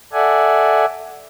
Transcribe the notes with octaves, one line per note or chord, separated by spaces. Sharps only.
A4 D5 E5 F#5 G#5